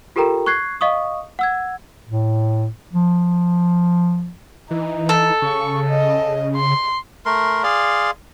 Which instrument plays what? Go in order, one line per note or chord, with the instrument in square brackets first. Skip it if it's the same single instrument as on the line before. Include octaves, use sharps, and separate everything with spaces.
[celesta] F4 G4 A4 A#4 G5 A#5
C#6 F#6 G#6 C7
D#5 F5 C#6 D#6
F#5 E6 G#6
[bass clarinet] A2
F3
[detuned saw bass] E3 [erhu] D#4
[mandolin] A4
[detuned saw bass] C#3 [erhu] C#6
[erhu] D#5
C6
[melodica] A3 A#4 C6
G#4 D5 F5 C6